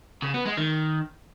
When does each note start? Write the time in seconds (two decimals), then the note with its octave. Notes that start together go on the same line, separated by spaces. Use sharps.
0.22 C#3
0.34 B3
0.46 G#3
0.57 D#3